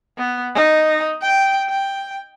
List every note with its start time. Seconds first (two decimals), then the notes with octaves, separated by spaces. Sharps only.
0.19 B3
0.55 D#4
1.22 G5
1.69 G5